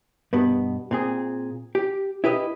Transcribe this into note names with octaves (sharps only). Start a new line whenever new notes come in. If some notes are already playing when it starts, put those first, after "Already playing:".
G2 B2 B3
A#2 C4 G#4
G4
E4 G4 B4 D#5